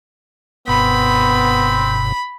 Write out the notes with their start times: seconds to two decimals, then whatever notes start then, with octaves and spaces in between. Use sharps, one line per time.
0.68 F#1 G2 B2 B3 C4 B5